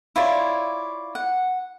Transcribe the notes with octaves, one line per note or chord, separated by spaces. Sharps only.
E4 F4 C#5 D5
F#5